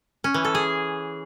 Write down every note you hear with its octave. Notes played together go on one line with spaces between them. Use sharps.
C#4
E3
A4
G#4